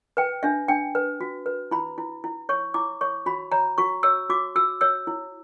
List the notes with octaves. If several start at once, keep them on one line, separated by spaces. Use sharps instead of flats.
B4 G5
D4 E5
D4 G5
B4
F#4
B4
E4 B5
E4
E4
C#5 C#6
E4 D6
C#5 C#6
F#4 B5
C#5 A#5
F#4 C#6
C#5 E6
F#4 D6
F#4 E6
C#5 E6
E4